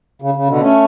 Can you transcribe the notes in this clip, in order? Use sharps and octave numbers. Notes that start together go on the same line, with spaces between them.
C#3
C#3
B2 D3
A3 C#4